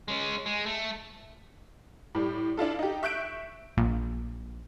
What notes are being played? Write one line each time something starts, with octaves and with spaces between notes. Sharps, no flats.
G#3 C#4
G#3
A3
A2 G3
D4 E4 F4 A4
D#4 G4
E5 C#6 F#6 G6 D7
A#1